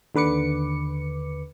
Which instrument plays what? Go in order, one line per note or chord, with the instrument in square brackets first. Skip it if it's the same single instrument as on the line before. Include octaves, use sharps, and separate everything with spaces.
[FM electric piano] D#2 D3 B4 D6 C#7